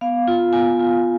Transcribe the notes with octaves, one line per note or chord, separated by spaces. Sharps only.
B3 F5
F4
B3 G#5
F4